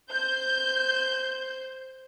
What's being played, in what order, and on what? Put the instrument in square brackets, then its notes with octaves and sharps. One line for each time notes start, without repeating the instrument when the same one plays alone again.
[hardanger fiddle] C5 [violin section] G6